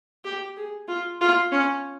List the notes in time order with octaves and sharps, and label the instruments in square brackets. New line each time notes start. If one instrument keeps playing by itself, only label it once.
[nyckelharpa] G4
G#4
F4
F4
C#4